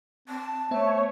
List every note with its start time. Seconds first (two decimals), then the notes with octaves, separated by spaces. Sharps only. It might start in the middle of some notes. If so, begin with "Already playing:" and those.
0.28 C4 A5
0.71 A3 B3 C5 C#5 E5